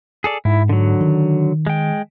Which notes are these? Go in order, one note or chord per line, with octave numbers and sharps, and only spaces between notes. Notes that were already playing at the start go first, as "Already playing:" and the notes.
G#4 A4 D5
G#2 E4
D3 F#3
D#3
G#3 G5